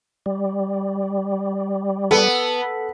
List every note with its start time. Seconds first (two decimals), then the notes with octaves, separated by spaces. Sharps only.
0.26 G3
2.11 B3 A4